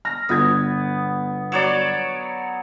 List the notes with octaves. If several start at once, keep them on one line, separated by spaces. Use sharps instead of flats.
F6 A#6
G1 B3 F4 G#6
F#3 C#5 D5